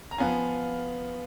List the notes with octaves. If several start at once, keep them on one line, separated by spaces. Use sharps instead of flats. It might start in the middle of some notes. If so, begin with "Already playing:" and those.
A#5
F3 B3 F4 F5 G#5